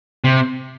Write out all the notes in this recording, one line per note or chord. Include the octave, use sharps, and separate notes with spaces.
C3